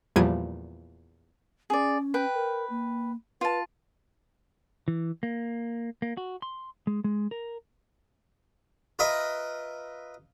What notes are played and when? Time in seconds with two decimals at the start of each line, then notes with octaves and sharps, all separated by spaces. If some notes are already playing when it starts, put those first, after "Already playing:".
0.16 E2 A#2 F3 G3 G#6 D#7
1.70 C#4 G#4 D5
2.14 B4 G5
2.34 A#4
2.70 A#3
3.41 F4 B4 A5
4.88 E3
5.23 A#3
6.02 A#3
6.17 F#4
6.42 C6
6.87 G#3
7.04 G#3
7.31 A#4
8.99 F4 A#4 B4 D#5 E5